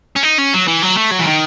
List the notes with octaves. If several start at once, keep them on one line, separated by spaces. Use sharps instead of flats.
C#4
D#4
C#4
F#3
E3
F#3
A3
F#3
E3
D#3